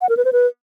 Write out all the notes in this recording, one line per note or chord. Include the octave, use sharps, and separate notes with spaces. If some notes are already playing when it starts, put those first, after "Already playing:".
F#5
A#4
B4
C5
B4